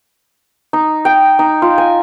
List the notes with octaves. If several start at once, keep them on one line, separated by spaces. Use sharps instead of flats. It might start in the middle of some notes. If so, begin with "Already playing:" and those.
D#4
G5
D#4
F4
G#5